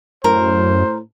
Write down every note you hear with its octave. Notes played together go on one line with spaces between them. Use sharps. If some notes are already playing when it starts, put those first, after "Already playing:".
F#2 A2 A#4 C5